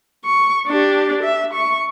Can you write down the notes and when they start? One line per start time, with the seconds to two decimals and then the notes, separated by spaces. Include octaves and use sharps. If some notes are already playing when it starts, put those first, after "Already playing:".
0.25 C#6
0.68 D4 G4
1.23 E5
1.54 C#6